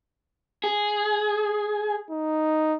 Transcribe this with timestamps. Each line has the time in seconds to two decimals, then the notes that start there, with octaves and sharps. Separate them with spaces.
0.64 G#4
2.10 D#4